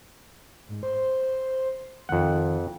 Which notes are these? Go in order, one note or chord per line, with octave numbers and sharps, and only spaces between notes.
G#2
C5
F2 D#3 F#5